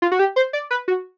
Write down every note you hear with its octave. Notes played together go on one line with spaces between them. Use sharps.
F4
F#4
G4
C5
D5
B4
F#4